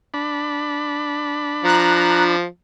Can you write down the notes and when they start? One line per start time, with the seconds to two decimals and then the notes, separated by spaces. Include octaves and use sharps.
0.14 D4 B5
1.64 F3 A#5 F#6